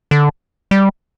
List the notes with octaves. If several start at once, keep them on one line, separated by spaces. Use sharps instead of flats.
D3
G3